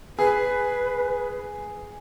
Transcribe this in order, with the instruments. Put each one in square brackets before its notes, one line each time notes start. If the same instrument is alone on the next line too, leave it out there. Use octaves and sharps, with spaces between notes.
[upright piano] G#4 [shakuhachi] B4